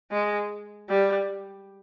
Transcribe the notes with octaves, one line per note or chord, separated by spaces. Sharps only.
G#3
G3